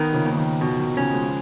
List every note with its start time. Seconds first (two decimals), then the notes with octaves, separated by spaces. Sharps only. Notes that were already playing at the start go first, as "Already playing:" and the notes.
Already playing: D#3 B3 D#4
0.13 C#3 F3
0.25 D#2
0.37 D#3
0.61 B2 D#3
0.79 D#3
0.97 C#3 F3 C#4
1.14 F3 G#3